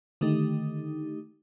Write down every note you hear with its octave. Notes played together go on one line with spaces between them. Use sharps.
D3 D#3 A3 D#4 G4